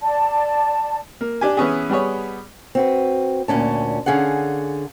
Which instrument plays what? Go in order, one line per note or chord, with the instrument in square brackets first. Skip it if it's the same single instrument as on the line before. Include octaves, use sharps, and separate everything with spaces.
[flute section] D5 A5
[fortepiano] A#3
D4 G4 G#5
E3 B3 C#4 G#4
G3 B3 G#4 C#5
[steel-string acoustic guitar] C4 F#4 B4
D2 A#2 C#4 A5
D3 C#4 G#4 F5 F#5